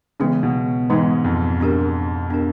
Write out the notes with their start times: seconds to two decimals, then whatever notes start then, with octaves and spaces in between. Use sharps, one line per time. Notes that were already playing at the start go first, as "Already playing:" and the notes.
0.20 C#3 E3 G#3 B3 D#4
0.43 B2
0.90 G#2 E3 G#3 B3 D#4
1.24 F2
1.60 B3 D4 G4 A#4
2.30 B3 D4 G4 A#4